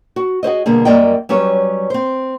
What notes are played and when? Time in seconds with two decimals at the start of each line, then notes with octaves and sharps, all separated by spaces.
0.16 F#4
0.43 F#4 G#4 C5 D#5
0.66 B2 D3 G3 A#3 G#4
0.85 F#2 G3 A#3 D5 D#5 G5
1.29 F#3 G3 C#4 G4 B4 C#5
1.90 C4 C5